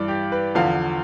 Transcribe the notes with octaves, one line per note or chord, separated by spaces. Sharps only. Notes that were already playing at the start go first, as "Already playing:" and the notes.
Already playing: G2 E3 D5
G4
B4
E2 D3 F3 F5